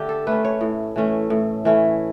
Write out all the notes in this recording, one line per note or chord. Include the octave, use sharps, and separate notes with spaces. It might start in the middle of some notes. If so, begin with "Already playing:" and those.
Already playing: D3 A3 G4
A4
A3 C#4 B4
C#5
A2
E3 A3 C#4
A2
E3 A3 C#4